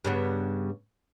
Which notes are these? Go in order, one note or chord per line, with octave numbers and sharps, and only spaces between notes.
G2 C#3 B3